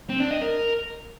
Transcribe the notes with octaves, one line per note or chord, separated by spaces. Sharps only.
C4
D4
D#5
A#4